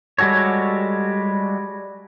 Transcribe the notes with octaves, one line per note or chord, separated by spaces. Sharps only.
G3 G#3 F#4 A4 C#5